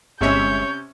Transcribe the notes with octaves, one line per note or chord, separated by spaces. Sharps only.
G1 C3 G#3 C#4 C#5 E5 G6